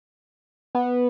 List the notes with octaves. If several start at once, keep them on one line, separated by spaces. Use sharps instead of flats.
B3